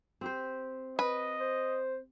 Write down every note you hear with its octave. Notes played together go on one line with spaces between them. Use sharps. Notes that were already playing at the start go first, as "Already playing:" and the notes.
C4 G4 C5
B4 D#5
C5